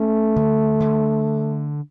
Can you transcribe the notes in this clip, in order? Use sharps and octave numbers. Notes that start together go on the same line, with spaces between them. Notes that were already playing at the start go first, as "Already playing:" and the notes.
Already playing: A3 C#4
D3
D3